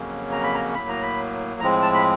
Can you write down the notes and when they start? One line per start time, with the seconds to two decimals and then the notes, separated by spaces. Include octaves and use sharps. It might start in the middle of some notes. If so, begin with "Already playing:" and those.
Already playing: F2 C#3 F#3 A#3 C#4
0.32 A#5
0.43 B5
0.55 A#5
0.75 A2 F#3 A#3 B5
0.88 A#5
1.02 B5
1.60 A2 F3 G#3 C4 A#5
1.82 A5
1.94 B5